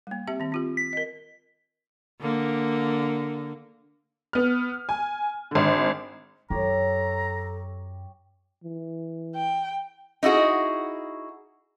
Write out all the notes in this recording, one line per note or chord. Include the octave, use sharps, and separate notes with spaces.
G3 A#3
C4 G4 E5
D#3 C4
C4 F4 G4
B6
A#4 D#5
D3 A#3
B3 F6
G#5
G#1 D3
F#2 G4 A4 C#5 A#5
E3
G5
D#4 E4 F#4 G#4